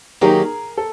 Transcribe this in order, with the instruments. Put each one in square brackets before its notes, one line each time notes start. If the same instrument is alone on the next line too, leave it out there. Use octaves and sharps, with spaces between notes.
[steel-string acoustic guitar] D#3 F#3 A#3 D#4 G4 [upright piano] G#4 A#4
[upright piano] A4